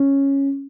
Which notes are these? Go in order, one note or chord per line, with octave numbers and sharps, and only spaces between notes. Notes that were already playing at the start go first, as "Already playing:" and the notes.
Already playing: C#4